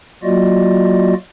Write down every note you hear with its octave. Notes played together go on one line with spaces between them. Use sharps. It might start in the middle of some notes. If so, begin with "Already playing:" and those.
F#3 A#3 F4 F#4 D5 D#5